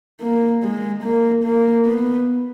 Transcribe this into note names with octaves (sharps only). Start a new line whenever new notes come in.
A#3
G#3
A#3
A#3
B3